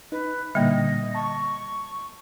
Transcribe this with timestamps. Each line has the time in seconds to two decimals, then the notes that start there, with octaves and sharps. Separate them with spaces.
0.12 D#4 B4
0.55 A#2 D3 G3 A#3 D#5
1.15 A5 C#6